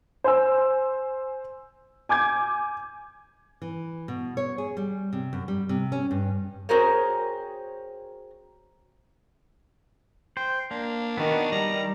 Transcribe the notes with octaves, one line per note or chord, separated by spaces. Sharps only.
C5 G#5 E6
G#5 D6 G6 G#6
E3
B2
C#5
G#4
G3
C3
F#2
G3
C3
C#4
G2
C4 F#4 G#4 A#4 C5 C#5
C5 G5
A#3 D4
D#3 B3 F#4
G3 A#5